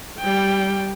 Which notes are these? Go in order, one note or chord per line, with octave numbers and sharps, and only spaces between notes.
G3 G5